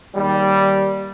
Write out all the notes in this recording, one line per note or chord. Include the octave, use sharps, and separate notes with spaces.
D#2 G3